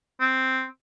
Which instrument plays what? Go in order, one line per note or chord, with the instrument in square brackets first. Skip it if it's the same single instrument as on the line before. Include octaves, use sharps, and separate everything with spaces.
[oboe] C4